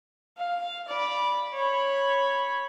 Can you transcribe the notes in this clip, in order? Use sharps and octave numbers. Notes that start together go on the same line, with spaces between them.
F5
D5 B5
C#5 B5